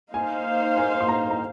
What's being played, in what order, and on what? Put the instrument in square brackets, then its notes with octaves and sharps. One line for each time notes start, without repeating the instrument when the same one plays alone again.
[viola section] A#3 D#4 C5 F5 [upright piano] G#5
[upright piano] G#5
C6
A#5
A#5